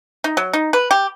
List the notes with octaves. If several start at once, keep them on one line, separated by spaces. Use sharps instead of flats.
D#4
F#3
D#4
B4
G4